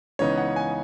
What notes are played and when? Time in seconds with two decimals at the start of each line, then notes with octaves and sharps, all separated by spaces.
0.19 C#2 C#3 E3 B3 D#4 C#5
0.37 F#5
0.56 G#5